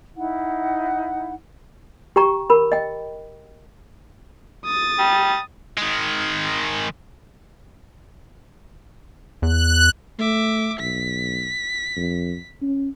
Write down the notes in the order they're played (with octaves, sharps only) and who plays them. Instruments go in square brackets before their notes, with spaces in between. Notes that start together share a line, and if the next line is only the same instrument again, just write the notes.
[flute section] D#4 E4 F#5
[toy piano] G4 G5 A#5 C#6
A#4 B5
D#5 G5
[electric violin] D#6 A6
[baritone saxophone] G3
[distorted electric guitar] D#3 G#3
[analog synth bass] E2 [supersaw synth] F#6
[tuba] A3 [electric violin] E5 D6
[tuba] B1 [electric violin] B6
[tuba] F2
C#4